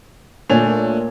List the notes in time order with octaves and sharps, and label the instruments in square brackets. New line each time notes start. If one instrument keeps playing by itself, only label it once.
[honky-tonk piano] A#2 C#5 F7 [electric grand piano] A3 D4 G#5